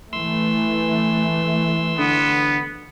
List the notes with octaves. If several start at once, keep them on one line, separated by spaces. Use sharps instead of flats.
E3 A3 C6 E6
D3 B3